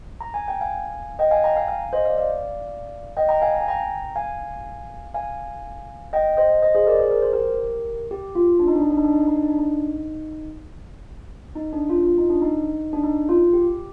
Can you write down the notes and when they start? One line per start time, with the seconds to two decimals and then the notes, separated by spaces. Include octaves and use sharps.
0.21 A#5
0.34 G#5
0.48 G5
0.61 F5 G#5
1.19 D#5 G5
1.31 F5 G#5
1.44 G5 A#5
1.56 F5 G#5
1.68 F5 G#5
1.93 C5 D#5
2.05 D5 F5
2.18 D5 F5
3.17 D#5 G5
3.28 G5 A#5
3.42 F5 G#5
3.54 A#5
3.61 G#5
3.68 G5 A#5
4.16 F5 G#5
5.14 F5 G#5
6.13 D#5 G5
6.37 C5 D#5
6.62 C5 D#5
6.75 G#4 C5
6.87 A#4 D5
6.99 G#4 C5
7.11 A#4
7.22 C5
7.33 G4 A#4
8.11 G4
8.35 F4
8.59 D4
8.68 D#4
8.75 D4
8.82 D#4
8.90 D4
8.97 D#4
9.04 D4
9.13 D#4
9.20 D4
9.27 D#4
9.35 D4
9.42 D#4
9.50 D4
9.59 D#4
11.55 D#4
11.73 D4
11.89 F4
12.05 F4
12.18 D#4
12.30 D4
12.42 D#4
12.93 D4
13.04 D#4
13.29 F4
13.53 G4